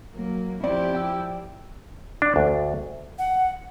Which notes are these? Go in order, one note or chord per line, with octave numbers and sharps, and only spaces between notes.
F#3 A#3
F3 C4 E4 G4 D5
G5 E6
D4
D2
F#5